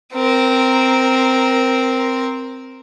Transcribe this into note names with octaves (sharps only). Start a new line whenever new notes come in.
C4 A#4